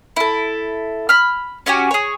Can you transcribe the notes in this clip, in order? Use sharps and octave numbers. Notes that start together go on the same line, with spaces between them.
E4 A4
B5 F6
C#4 F#4 G4 G#5
G#4 C#5